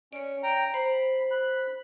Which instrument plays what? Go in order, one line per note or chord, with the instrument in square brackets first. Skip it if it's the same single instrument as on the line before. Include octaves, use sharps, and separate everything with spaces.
[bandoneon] C#4 [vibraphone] C#5 D5
[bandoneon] G5 A#5
[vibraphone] C5 [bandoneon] B5
[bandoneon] B5 F#6